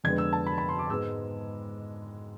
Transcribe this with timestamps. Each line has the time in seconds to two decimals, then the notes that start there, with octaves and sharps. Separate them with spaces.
0.04 F2 D3 G#3 B3 G#6
0.18 E6
0.33 A5
0.46 B5
0.58 B5
0.69 C6
0.79 D6
0.90 G#2 G#3 B3 E6